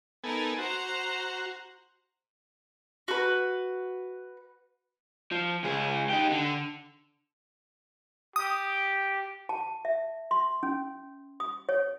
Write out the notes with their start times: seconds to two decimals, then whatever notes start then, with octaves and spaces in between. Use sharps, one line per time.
0.24 B3 D#4 A4 A#4 G#5
0.58 F#4 C5 A#5
3.08 F#4 B4
5.31 F3
5.63 C#2 G#4
6.09 D#4 G4
6.32 D3
8.36 G4 D#6
9.49 A5
9.85 E5
10.31 C6
10.63 C#4
11.40 D#6
11.69 C#5